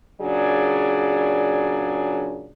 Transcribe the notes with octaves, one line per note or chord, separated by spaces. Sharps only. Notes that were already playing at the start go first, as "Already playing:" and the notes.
A#2 C#3 F#3 D4 G#4 D5